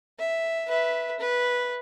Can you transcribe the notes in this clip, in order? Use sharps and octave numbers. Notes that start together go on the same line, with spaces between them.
E5
B4 E5
B4